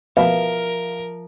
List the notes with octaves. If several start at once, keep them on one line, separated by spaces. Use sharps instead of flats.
B2 F3 A#4 E5 F5